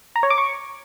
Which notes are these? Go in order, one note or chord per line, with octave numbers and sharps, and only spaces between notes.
A#5
C#5
D6
C#6